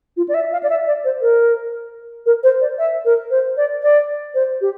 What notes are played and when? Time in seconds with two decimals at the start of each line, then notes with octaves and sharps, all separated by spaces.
0.17 F4
0.28 D5
0.34 E5
0.52 F5
0.63 D5
0.70 E5
0.87 D5
1.04 C5
1.22 A#4
2.26 A#4
2.43 C5
2.61 D5
2.78 E5
3.05 A#4
3.31 C5
3.57 D5
3.82 D5
4.34 C5
4.61 G4